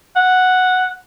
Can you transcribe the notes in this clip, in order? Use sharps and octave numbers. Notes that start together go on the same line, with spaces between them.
F#5